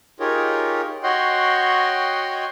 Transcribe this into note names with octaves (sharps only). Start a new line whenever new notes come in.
D#4 F4 G4 G#4 A#4 C#5
F#4 C#5 D#5 F#5 G5 C6